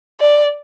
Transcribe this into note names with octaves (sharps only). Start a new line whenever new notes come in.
D5